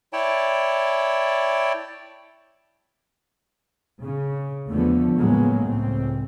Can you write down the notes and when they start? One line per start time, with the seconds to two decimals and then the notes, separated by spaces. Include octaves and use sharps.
0.13 E4 C#5 D5 G5 A5
4.02 C#3
4.70 E2 D3 F3 A3 B3
5.17 A2 C#3 F#3 G#3 A#3 B3
5.66 C#2 A2 C4